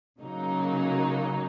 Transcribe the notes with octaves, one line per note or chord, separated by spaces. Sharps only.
C#3 F#3 A#3 D#4